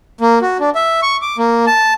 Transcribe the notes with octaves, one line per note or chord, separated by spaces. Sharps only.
A#3
F#4
D4
E5
C#6
D6
A#3
A5